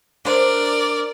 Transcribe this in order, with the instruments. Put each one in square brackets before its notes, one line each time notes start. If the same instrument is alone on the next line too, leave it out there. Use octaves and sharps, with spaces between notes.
[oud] D4 C5 [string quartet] A#4 D5